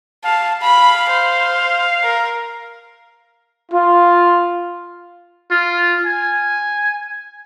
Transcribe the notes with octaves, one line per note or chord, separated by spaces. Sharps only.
F5 A5
F5 B5
C5
A#4
F4
F4
G#5